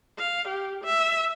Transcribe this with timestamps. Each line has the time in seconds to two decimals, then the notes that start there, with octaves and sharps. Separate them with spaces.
0.19 F5
0.49 G4
0.84 E5